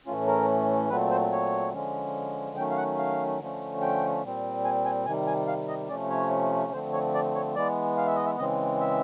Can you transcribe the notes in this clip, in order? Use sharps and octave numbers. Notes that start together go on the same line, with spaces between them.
A2 E3 A3 C#4 F4
A#4
A#2 F#3 A3 C4 B4
C5
C#5
D3 F3 G#3 C#4
D#3 F#3 A3 C#4 G5
F5
F#5
F5
D3 F3 A3 C#4
G5
A#2 G3 C4
G#5
G#5
C3 D#3 G3 G#5
G#5
F5
D#5
C3 F3 A3 C#4 D5
C#5
D3 F3 A3 C4 C5
C#5
D5
C#5
E3 G#3 B3 D5
F5
E5
D#5
E5
C#3 E3 G#3 C4 D#5
E5